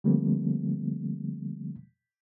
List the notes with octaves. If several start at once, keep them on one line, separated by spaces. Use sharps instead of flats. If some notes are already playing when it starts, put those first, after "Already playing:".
D3 F3 G3 A3 A#3 C4